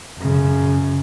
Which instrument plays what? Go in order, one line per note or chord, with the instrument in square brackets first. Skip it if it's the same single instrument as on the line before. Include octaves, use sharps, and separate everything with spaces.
[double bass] F#2 C#3